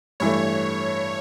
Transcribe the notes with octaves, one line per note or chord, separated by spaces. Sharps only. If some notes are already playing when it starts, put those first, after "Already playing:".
G2 E3 A3 C#5